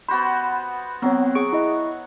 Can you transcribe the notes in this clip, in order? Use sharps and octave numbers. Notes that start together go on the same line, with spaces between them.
B3 F#4 C5 B5
F#3 B3 C4 C#5
G#4 C#6 D7
E4 D#5